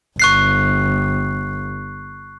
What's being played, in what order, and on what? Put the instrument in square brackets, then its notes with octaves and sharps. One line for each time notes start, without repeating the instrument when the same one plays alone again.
[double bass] G1 [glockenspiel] C#6 F#6 C7